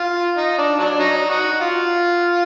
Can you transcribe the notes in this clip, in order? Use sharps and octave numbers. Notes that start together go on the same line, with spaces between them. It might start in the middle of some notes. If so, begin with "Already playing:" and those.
Already playing: F4
D#4
D4
F#3 D4
F#3 D#4
D#4 F#4
F4